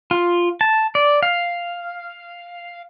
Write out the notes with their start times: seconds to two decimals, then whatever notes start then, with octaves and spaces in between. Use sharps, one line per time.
0.11 F4
0.61 A5
0.95 D5
1.23 F5